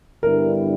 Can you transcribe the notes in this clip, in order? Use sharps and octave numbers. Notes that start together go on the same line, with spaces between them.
G2 D3 G3 B3 E4 A#4